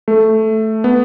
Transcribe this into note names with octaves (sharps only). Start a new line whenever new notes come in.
A3
B3